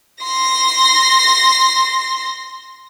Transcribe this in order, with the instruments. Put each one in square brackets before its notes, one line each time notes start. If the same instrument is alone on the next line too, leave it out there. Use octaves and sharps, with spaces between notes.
[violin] C6 A#6